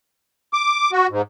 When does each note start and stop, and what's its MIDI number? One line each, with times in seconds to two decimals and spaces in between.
0.53 0.91 86
0.93 1.07 66
1.10 1.22 44